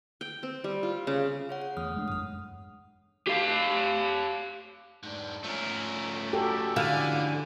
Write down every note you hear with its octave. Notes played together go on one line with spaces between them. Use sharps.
G5
C4
G3
F4
C#3
G#4 C#5 F#5
F#5
E2 A3 D#6 F6
F#1 G#3 D4
A1 F#2 D#6 F6
G4 F5
G#2 D4
F3 A3 C#4 A#4
F#4 G4 A4
D3 E4 F5 G#5